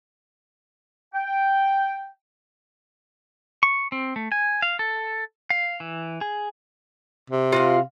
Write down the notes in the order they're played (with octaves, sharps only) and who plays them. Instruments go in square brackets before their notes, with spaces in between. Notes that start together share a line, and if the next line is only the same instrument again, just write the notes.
[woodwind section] G5
[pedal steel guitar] C#6
C4
A3
G#5
F5
A4
F5
E3
G#4
[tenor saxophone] C3
[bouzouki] F4 F#4 F5